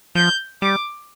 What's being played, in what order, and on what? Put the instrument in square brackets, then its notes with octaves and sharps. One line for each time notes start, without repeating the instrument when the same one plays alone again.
[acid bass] F3 [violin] G6
[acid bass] G3 [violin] D6